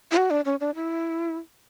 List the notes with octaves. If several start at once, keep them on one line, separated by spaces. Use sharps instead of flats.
E4
F#4
D4
C#4
D4
E4